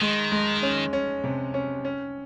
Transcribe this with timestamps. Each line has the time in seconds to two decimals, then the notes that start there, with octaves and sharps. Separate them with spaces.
0.01 D#3 G#3
0.32 G#3
0.62 C#4
0.93 C#4
1.24 C3
1.54 C#4
1.85 C#4